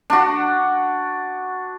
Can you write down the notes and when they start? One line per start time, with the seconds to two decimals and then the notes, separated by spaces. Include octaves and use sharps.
0.10 D4 F#4